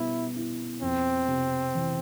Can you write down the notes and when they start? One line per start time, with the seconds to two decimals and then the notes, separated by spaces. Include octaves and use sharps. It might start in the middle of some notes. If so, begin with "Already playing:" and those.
Already playing: B2 G3 B3 E4
0.36 E4
0.82 F2 C4
1.28 C3
1.75 E3